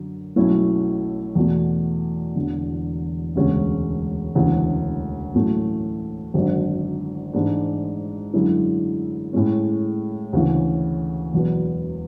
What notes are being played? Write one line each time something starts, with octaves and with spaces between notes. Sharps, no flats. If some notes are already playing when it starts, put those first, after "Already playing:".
Already playing: F#2 D3
B1 B2 A3 C#4 E4
E2 B2 A3
E1 E2 D3
E1 D2 C#3 G#3 C#4
E1 D2 C#3 E3
A2 F#3 A3 C#4
G#1 F#2 D3 F#3
A1 G#2 G#3 D4
F#2 D3 G#3 C#4 E4
A2 G#3 C#4
D2 C#3 E3
E1 E2 B2 F#3 B3